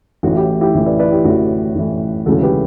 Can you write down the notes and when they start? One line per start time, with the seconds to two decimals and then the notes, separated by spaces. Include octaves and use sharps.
0.23 A1 A2 E3 F#4
0.36 E4 G4
0.61 E4 G4
0.74 A1 A2 E3
0.86 B4 D5
0.99 B4 D5
1.12 E4 G4
1.24 A1 A2 E3 F#4
1.75 A1 A2 E3
2.26 E1 D2 C#3 E3 F#4 A4
2.43 G4 B4